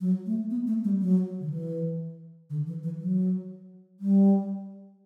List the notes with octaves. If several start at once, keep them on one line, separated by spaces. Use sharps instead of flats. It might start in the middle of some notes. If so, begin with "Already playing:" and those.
F#3
A3
B3
A3
G3
F#3
D3
E3
D3
E3
E3
F#3
G3